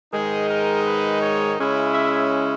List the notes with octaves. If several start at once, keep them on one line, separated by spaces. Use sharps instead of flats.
G#2 D#3 G#3 D#4 G#4
A#4
B4
C#5
C#3 G#3 C#4 E4
E5